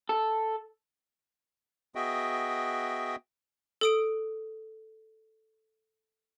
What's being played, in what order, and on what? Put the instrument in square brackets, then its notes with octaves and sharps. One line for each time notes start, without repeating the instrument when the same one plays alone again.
[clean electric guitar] A4
[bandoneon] B3 F#4 G#4 D#5 E5 G5
[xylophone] A4 D#6 D7